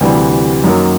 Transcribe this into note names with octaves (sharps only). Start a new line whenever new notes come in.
D2 C3 E3 G3
F#2 D#3 F#3 A#3